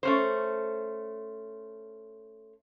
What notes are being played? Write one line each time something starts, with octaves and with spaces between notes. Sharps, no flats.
A3 C#4 C5